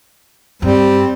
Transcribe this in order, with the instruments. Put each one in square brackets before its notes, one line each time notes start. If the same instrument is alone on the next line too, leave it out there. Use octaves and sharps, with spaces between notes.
[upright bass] G2 [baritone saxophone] G3 [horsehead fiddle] C4